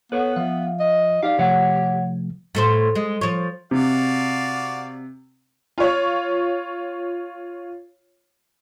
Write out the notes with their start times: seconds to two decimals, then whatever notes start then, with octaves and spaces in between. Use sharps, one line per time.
0.12 B3 A4 B4 C#5
0.36 F3 E5 F5
0.80 D#5
1.23 D#4 G4 D5 F5
1.39 C3 F3 A3 C#5 F#5
2.55 A2 A4 C5
2.95 G#3
3.21 F3 C#5
3.71 C3 F#4 D5 F5
5.78 F4 C#5